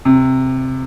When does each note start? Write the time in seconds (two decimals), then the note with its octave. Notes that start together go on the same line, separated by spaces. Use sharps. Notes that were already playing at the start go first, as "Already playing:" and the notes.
0.05 C3